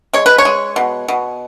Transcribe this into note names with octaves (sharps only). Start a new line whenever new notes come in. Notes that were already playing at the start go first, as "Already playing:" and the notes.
G#3 C#5
B4
C#5
G#3
B2
B2